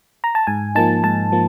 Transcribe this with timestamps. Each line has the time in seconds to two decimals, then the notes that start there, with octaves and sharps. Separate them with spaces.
0.24 A#5
0.35 A5
0.47 G#2 G#5
0.75 F3 A#3 D#4 A5
1.03 G#2 A5
1.32 F3 A#3